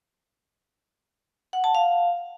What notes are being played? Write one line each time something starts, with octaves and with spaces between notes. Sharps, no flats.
F#5
A5
F5